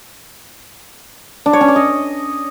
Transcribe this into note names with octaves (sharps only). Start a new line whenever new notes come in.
D4
C#5
C#4
D5
D#5